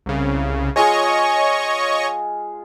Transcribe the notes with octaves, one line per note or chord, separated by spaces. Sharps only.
C2 C#3
G#3 F4 G#4 C#5 D#5 C#6